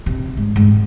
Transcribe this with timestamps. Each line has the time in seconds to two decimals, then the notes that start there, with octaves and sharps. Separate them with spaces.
0.06 C3
0.37 G#2
0.56 G#2